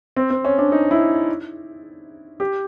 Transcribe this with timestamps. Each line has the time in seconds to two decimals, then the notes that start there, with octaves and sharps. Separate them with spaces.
0.17 C4
0.30 C4
0.45 C#4
0.58 D4
0.72 D#4
0.91 E4
2.40 G4